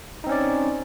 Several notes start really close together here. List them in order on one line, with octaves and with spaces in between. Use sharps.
D#4 C4 C#4 D5